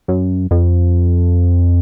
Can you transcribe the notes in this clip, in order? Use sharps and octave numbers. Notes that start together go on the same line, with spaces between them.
F#2
F2